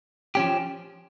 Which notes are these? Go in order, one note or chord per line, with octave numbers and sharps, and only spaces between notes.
F3 C#4 G4